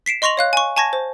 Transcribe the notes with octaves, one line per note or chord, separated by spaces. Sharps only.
B6 C7 D7 E7
D#5 C6 C#6 A#6 F7 F#7
C#5 F5 F#6
G#5 C#6
G#5 A5 C#6 G#6 A#6
C5